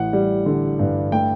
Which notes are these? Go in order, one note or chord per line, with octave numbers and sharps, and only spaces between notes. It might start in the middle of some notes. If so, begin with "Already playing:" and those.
Already playing: A1 F#5
G3
D3
G2
A3 G5